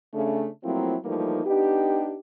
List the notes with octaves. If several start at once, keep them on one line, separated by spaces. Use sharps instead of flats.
C#3 A3 D4
F3 F#3 A3 A#3 C4 E4
E3 F3 G3 A3 A#3 D#4
B3 D4 D#4 G4